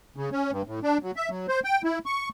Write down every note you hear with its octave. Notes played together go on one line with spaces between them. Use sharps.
C#3
C#4
G2
A2
D4
F#3
E5
F#3
C5
G5
E4
C#6